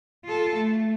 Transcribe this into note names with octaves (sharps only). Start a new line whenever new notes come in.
F4 A4
A3